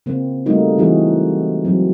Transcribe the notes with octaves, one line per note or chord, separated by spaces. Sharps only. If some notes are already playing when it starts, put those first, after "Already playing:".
C#3 A#3 C4
G3 A3 A#3 D#4 F#4
E3 G#3 C4 D#4 F#4 G#4
F#3 C4